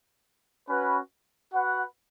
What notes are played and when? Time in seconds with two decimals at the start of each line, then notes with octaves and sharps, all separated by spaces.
0.69 C#4 F#4 B4
1.53 F#4 B4 F#5